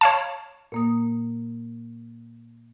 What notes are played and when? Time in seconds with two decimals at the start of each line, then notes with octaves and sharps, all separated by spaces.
0.01 C#5 F5 A5
0.72 A#2 A#3 D#6